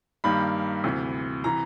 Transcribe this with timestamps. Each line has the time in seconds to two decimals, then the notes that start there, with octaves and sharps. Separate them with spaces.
0.24 G2 D#3 G3 A#3 B5
0.84 D2 C3 E3
1.44 C3 E3 A#5